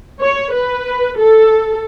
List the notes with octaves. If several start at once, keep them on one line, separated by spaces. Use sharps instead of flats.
C#5
B4
A4